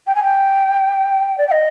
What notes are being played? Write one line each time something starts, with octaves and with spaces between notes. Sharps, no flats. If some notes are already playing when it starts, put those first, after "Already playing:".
G5
G#5
G5
D5
G5
D#5